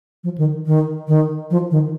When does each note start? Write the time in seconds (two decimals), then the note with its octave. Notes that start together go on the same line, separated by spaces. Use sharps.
0.24 F3
0.38 D#3
0.66 D#3
1.08 D#3
1.51 F3
1.71 D#3